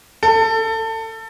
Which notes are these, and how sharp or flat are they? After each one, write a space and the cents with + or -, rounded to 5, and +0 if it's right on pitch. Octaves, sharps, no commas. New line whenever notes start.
A4 +25